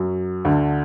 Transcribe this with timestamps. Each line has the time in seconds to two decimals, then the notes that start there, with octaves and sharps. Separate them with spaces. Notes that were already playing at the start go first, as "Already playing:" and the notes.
Already playing: F#2 F#3
0.45 D2 D3